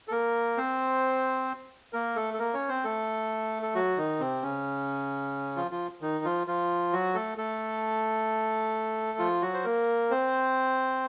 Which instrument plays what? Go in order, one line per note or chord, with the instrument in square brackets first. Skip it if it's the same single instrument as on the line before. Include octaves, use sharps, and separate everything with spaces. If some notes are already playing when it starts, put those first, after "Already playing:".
[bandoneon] A4
A#3 A#4
C4 C5
A#3 A#4
A3 A4
A4
A#3 A#4
C#4 C#5
C4 C5
A3 A4
A4
F#3 F#4
D#3 D#4
C3 C4
C#3 C#4
F3 F4
F3 F4
D#3 D#4
F3 F4
F3 F4
F#3 F#4
A3 A4
A3 A4
F3 F4
F#3 F#4
C5
A#3 A#4
C4 C5